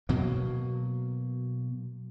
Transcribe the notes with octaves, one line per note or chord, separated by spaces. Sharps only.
B2 F#3 A#3